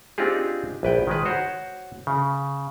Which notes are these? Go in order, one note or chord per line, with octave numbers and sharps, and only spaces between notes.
C4 D4 D#4 F4 G4 G#4
A#1 B4 G5
D#3 G#3 B4
F#4 C5 C#5 F#5
C#3